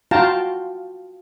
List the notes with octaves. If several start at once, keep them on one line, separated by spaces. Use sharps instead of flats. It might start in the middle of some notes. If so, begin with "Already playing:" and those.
F4 F#4 F5 G5 A5 A#5